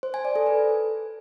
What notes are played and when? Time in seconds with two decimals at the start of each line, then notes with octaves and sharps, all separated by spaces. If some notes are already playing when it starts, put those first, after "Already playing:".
0.03 C5
0.14 G#5
0.25 D5
0.36 A4
0.46 B4